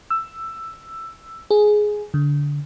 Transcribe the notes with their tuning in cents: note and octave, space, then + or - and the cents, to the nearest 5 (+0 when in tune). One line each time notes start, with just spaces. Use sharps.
E6 +10
G#4 +10
D3 -20